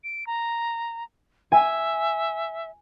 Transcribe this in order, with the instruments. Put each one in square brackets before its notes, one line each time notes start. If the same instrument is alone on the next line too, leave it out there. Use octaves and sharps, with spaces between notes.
[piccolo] D7
A#5
[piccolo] E5 [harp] G#5